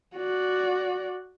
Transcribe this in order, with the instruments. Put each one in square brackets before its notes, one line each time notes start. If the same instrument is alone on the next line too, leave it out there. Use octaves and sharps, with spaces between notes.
[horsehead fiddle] F#4 D5